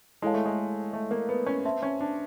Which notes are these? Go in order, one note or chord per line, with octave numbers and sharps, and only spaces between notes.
G#3 E4 A4 C#5 F5 A5
A3
G#3
A3
A#3
B3
C#4
C4 B4 E5 A5 C6
C#4
D4